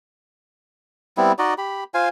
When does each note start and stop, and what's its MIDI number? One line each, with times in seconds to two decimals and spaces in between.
1.17 1.32 55
1.17 1.32 59
1.17 1.32 60
1.17 1.32 64
1.39 1.54 63
1.39 1.54 66
1.39 1.54 74
1.39 1.54 75
1.58 1.84 67
1.58 1.84 83
1.94 2.09 65
1.94 2.09 72
1.94 2.09 77
1.94 2.09 80